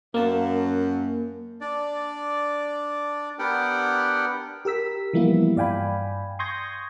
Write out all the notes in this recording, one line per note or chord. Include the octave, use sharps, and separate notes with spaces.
F#2 A#3 A5
D4 D5
B3 D4 G4 A#4 F#5 G5
G4 A#4 E6 B6
E3 F3 G3 A#3 B3 E4
G2 D5 F5 G5 G#5 B5
C6 C#6 D#6 G6 G#6 A#6